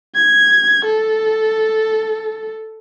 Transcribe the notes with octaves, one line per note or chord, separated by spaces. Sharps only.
G#6
A4